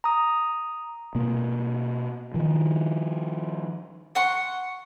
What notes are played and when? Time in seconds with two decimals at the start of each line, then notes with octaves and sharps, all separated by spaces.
0.04 A#5 D#6
1.15 B2 A#3
2.34 D#3 F3
4.15 F#5 C6 C#6